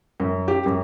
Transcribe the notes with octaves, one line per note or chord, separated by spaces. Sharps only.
F#2
G4
F#2